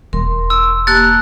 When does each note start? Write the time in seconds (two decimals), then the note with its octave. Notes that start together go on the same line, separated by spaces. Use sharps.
0.13 E1 A#4 C6
0.50 E6
0.87 A#3 G4 A5 F#6 A6